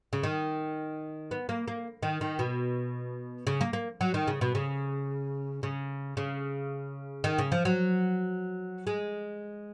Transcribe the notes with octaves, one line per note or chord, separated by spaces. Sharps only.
C#3
D#3
B3
A#3
A#3
D#3
D#3
B2
C#3
A#3
A#3
F#3
D#3
C#3
B2
C#3
C#3
C#3
D#3
C#3
F3
F#3
G#3